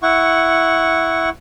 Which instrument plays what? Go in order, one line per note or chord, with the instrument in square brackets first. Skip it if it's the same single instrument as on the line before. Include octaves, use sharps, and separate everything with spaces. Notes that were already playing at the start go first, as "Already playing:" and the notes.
[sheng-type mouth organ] E4 F#5 C#6